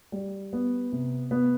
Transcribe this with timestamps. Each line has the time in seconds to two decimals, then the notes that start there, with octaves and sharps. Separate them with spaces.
0.12 G3
0.53 B3
0.92 C3
1.31 B3